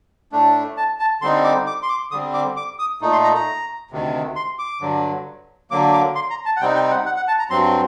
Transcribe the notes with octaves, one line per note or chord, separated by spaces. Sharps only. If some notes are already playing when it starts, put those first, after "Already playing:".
A2 A3 D4
A5
A5
D3 G3 C4 D#4 C6
D6
D6
C6
D6
D3 G3 C4 D#6
D6
D6
D#6
A#2 A3 D#4
C6
A#5
A#5
D2 C3 D#3
C6
D6
G2 D3 F#3
D3 F#3 A#3 D6
D6
C6
A#5
A5
F#5
C3 G3 C4 D#4 G5
G5
F#5
F#5
F#5
A5
A#5
G2 F#3 C4 C6